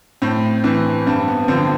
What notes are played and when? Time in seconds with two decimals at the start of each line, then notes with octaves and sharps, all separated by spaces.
0.22 A2 C4
0.64 E3 C4
1.06 G2 C4
1.28 B3
1.48 D3 F3 C4